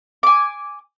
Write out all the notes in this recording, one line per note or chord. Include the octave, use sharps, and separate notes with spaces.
G#5 D6